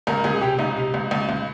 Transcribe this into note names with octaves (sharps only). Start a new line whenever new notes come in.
C#2 A#4
C#2 G#4
C3 G4
C#2 D#4
C3
C#2
C#2
C#2